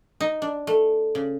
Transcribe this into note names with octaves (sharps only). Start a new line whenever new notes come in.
D#4
D4
A3
C#3